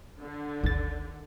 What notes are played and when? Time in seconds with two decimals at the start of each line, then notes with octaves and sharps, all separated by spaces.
0.20 D3
0.63 G1 D2 D#3 A6